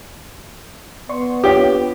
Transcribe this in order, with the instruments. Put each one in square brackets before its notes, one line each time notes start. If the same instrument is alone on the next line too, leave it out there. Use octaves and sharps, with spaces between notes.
[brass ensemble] B3 [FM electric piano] D5 C6 C#6
[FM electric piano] D4 F4 C#5 [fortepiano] G4